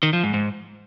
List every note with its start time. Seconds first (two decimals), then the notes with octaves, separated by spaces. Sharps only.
0.03 D#3
0.13 F3
0.23 G#2
0.34 G#2